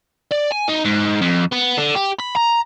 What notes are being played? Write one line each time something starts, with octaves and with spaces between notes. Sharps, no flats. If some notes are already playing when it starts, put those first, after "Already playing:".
D5
G#5
D#4
G#2
F2
B3
D3
G4
B5
A#5